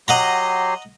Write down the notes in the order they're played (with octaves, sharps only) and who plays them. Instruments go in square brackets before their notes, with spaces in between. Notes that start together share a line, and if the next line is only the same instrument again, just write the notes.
[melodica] F#3 G4 C6 [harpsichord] D#5 F#5 A#5